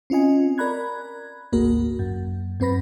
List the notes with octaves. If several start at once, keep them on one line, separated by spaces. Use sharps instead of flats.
C4 C#4 F4 D#5 G#5
A#4 D5 A#5 B5 F#6 G#6
G#1 D2 A#3 F#4 A#4
F#2
F#2 C4 B4 B5 A#6